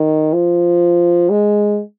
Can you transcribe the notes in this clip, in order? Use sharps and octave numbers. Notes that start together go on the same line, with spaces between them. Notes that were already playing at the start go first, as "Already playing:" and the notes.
Already playing: D#3
F3
G#3